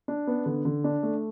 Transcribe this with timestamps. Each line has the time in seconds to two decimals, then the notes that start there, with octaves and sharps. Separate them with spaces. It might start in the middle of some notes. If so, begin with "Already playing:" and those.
0.08 D4
0.27 B3
0.46 D3
0.65 D3
0.84 D4
1.03 A3